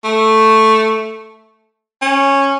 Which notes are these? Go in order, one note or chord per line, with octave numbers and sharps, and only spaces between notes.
A3
C#4